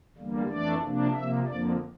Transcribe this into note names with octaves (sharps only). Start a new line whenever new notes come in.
E2 D3 G3 A#3
F2 E3 A3 D4 D5
C3 F3 A#3 D4
C3 F3 A#3 E5
F2 D3 F3 A#3 D5